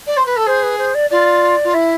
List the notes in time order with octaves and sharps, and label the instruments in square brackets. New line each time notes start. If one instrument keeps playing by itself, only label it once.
[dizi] D5
C5
B4
A4
[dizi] G#4 [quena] C5
[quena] B4
C5
D5
[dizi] F4 [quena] D5
[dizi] F4
[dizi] E4 [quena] E5